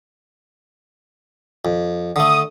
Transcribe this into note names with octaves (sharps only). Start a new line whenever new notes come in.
F2
D3 A3 D#6